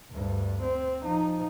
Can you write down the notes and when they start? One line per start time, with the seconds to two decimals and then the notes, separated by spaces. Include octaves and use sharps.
0.11 D2 G2
0.62 C4
1.02 F3 D#4